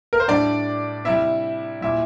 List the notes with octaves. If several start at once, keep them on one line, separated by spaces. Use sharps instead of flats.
A#4
C5
A2 G3 D4 D5
C3 G3 E4 E5
A#2 G3 E4 E5